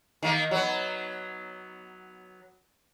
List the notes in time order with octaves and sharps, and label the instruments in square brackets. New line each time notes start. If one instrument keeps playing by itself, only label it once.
[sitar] D#3 A#3
F#3 B3